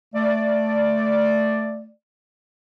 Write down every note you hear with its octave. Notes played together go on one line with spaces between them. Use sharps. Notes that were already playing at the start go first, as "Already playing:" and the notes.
A3 D5